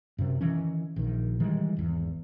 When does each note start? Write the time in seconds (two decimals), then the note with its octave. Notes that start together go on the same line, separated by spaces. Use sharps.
0.18 F#2 C3
0.41 D#3 E3 C#4
0.96 A#1 D#3
1.40 D#3 E3 G3 G#3
1.77 G#1 E2